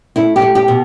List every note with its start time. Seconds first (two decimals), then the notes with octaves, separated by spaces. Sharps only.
0.16 A3 E4
0.36 G4
0.42 A3
0.55 G4
0.68 B2